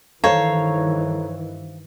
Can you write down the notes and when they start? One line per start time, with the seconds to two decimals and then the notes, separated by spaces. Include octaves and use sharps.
0.24 G2 D#3 E3 A4 C5 C#5 F5 A#5